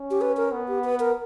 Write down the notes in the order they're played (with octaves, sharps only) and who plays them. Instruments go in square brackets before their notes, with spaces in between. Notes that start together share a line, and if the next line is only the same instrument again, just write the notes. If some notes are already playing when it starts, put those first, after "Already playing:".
Already playing: [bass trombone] C#4
[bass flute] G4
B4
A#4
[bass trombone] B3
[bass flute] G4
B4
A#4